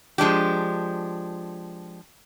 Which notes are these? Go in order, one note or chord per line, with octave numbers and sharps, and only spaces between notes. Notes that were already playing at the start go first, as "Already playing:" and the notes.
F3 G#3 D4 G4